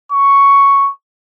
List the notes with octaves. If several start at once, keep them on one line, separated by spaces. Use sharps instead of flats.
C#6